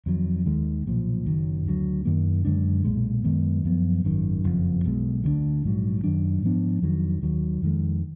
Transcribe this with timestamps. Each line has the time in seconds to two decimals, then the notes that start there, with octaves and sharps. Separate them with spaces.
0.06 F2 D#3 F#3
0.46 D#2 D#3 G#3
0.86 B1 A#2 F3
1.26 F#1 F#2 D#3 F#3
1.65 D2 D3 F#3
2.05 F#2 D#3 A#3
2.45 F#2 D3 G#3 D4
2.84 B1 A#2 G#3
3.24 F#2 D#3 G#3 B3
3.64 F#2 F3 B3
4.04 G#1 F#2 D#3
4.44 F#1 F2 F3
4.84 B1 B2 G#3
5.24 D2 D3 G#3 D4
5.63 A#1 G#2 F#3
6.04 F#2 D#3 F#3 D4
6.42 G#2 F3 B3 D4
6.82 F2 D#3 F#3
7.22 D#2 D#3 F#3
7.62 F2 D#3 G#3